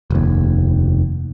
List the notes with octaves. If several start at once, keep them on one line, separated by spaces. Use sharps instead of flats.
F1 D#2